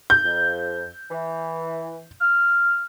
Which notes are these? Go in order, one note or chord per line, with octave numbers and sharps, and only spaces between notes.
G6
F2
E3
F6